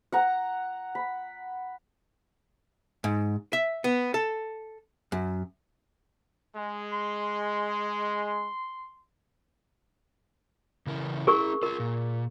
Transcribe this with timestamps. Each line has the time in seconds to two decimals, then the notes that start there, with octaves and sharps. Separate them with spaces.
0.12 F#5 A#5
0.95 B5
3.04 G#2
3.53 E5
3.84 B3
4.14 A4
5.12 F#2
6.56 G#3
6.92 C6
10.87 C#3 E3 A#4
11.27 C#4 E4 G#4 A#4 C#6
11.63 F4 G#4 A#4
11.80 A#2